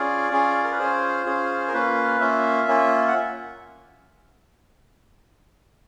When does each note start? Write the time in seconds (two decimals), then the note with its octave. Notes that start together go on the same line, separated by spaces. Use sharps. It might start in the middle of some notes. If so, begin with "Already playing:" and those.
Already playing: C#4 F4 G#4 D5
0.31 C#4 F4 G#4
0.64 A#4
0.72 B4
0.79 C#4 F4 G#4 C5
1.26 C#4 F4 G#4
1.68 A#4
1.74 A#3 C#4 F4 B4
2.20 A#3 C#4 F4 E5
2.68 A#3 C#4 F4
3.08 F#5